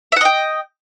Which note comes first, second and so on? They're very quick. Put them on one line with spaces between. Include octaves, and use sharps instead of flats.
E5 F#5 D#5 G5